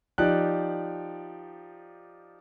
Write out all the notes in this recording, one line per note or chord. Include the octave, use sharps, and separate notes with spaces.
F3 D#4 G4 D5 F#6